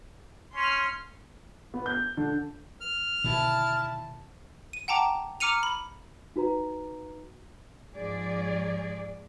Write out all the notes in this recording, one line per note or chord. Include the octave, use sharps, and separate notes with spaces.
C#4 C6 F6
B3
G6
D3
F6
B2 D3 D#3 E4 A5
D#7
F#5 G5 A5 A#5 D6
A#5 D6 F6 C#7 D#7 F7
B5
D#4 F#4 B4 A#5
G#2 F3 G#4 D5